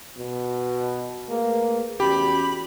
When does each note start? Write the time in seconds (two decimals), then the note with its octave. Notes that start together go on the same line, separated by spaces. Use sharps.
0.18 B2
1.29 A3 A#3 G#4 B4
2.00 E2 C#4 F#4 G4 B5